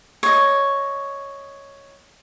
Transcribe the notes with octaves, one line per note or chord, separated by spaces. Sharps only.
C#5 D#5